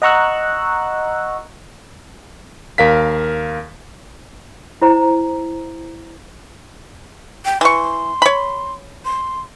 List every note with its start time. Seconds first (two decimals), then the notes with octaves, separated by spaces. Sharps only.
0.02 D#5 F#5 A#5 C#6 E6 F#6
2.78 D#2 A#4 F5 B6
4.82 E4 C5 A#5
7.45 G5
7.61 E3 C6 C#6
8.22 C#5 B5
9.05 C6